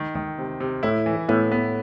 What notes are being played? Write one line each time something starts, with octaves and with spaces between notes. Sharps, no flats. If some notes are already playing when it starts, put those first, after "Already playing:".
Already playing: D#3
D#3
C3
C3
A2 E4
E3
A2 B3
B3